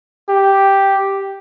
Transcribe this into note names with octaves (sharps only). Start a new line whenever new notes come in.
G4